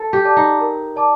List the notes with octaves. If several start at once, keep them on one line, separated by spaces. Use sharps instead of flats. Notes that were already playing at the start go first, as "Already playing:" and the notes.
Already playing: A4
G4
D5 A5 D6
D#4
A#4
D5 A5 D6